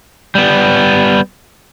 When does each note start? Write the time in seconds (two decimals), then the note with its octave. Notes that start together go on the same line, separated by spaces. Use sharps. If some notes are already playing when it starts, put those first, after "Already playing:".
0.35 G3 B3